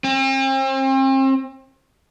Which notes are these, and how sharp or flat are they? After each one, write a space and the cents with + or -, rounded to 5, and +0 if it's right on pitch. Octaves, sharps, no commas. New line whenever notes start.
C4 +40